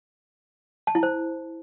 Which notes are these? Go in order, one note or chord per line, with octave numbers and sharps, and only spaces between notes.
A5
E4
C5